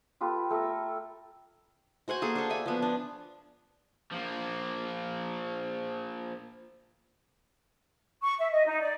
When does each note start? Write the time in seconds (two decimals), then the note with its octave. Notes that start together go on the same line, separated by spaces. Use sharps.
0.21 F4 G4 A4 B4
0.50 A3 A4 A#4 E5
2.08 F#4 C5 F#5 G#5
2.22 A#3 G#4 A4
2.36 D4 A4
2.50 D5 E5 G#5
2.66 F3 B3
2.82 D4
4.11 F3 A#3
8.23 C#6
8.39 E5
8.52 D#5
8.65 D#4
8.80 D5